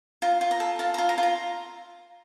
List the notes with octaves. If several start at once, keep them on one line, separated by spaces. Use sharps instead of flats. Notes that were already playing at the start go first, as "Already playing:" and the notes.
F4 A#5
F4
A#5
A4
F4 A5
A#5
F4
A#5
F4
A#5